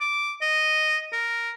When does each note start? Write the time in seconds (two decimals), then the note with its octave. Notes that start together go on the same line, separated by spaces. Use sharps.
0.01 D6
0.42 D#5
1.12 A#4